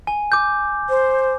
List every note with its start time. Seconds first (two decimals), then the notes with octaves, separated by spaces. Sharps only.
0.07 G#5
0.32 D6 G6
0.89 C5